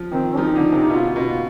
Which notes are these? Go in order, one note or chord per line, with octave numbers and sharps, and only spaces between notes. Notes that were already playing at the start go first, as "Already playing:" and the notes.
Already playing: F3
D#3 C4
F3 D#4
D3
C3
B2 F4
B2
F4